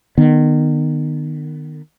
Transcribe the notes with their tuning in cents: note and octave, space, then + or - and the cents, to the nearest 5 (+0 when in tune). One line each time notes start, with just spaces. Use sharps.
D#3 -30 B3 +0